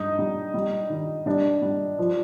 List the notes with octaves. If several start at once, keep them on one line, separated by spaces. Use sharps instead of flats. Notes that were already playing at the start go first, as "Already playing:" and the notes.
Already playing: G2 D#4
G3
G3
D#3
G3 D4
G3
F3